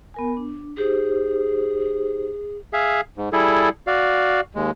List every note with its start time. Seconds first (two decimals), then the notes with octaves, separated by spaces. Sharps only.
0.14 B3 A#4 G#5
0.37 D4
0.77 D#4 G4 G#4 C5
2.73 G#4 E5 F5
3.18 G#2
3.33 G3 E4 G#4 A4
3.87 F#4 D5 F5
4.55 D#2 G#3